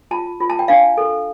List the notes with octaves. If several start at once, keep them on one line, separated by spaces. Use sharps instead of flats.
F4 A5
F4
A5
G5
D4 F5
A4